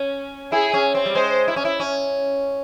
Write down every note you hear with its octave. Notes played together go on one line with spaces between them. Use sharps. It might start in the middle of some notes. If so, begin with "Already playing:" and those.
Already playing: C#4
E4 G#4
C#4
C4
G3
G#3 C5
E4
C#4
E4
C#4